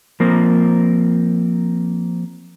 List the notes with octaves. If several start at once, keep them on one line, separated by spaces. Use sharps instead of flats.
F3 A#3 C4 A#4